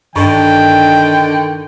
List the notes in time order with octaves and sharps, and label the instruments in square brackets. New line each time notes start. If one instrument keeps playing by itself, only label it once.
[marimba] G2 C#6 [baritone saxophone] D3 [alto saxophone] D#3 [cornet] G5